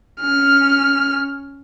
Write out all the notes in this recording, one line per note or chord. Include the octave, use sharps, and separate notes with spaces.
C#4 F6